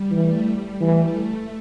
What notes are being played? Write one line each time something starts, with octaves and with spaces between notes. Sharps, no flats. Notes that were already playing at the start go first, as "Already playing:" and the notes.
Already playing: G3
E3 A3
G3
E3 A3
A3